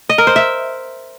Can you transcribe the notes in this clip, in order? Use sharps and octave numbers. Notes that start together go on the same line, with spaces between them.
D#5
A#4
C5
E5